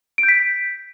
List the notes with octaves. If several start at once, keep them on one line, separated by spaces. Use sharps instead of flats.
D7
G6
B6